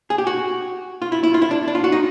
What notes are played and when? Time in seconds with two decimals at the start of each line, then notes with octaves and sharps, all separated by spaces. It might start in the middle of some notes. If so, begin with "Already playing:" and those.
0.10 G#4
0.18 G4
0.27 F#4
1.02 F4
1.12 E4
1.23 E4
1.34 F4
1.42 E4
1.51 D4
1.68 D4
1.75 F4
1.84 F#4
1.92 D#4